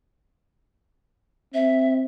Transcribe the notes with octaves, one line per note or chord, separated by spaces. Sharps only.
C4 E5